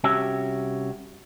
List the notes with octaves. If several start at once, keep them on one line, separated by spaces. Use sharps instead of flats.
C2 C#4 F#4 G4 E5